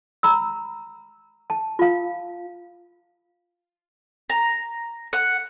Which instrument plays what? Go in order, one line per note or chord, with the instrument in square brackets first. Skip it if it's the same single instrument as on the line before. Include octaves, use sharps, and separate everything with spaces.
[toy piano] A#5 B5 E6
A5
F4 F5
[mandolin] A#5
F#5